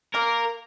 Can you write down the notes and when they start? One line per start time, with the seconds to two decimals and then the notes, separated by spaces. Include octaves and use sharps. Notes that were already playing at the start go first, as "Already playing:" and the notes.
0.14 A#3 A#4